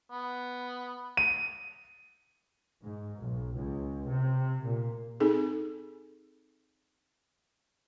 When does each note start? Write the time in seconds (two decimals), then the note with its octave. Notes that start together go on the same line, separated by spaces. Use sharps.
0.11 B3
1.17 D#7
2.83 G#2
3.20 B1
3.57 C#2
4.10 C3
4.65 A#2
5.20 C4 D#4 G#4 A4